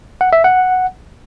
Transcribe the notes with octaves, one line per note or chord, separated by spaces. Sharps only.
F#5
E5
F#5